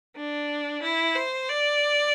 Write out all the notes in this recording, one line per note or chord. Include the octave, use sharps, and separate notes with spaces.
D4
E4
C5
D5